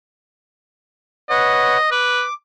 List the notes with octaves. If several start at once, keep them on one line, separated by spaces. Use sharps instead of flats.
B4 C#5 D#5 F#5
B4 D6